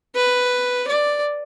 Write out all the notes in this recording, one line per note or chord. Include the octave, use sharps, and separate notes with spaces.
B4
D5